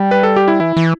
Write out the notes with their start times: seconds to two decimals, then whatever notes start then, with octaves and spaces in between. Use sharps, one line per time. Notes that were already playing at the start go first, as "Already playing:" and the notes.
Already playing: G3
0.11 B4
0.23 A4
0.36 G4
0.48 E4
0.60 E3 E4
0.77 E3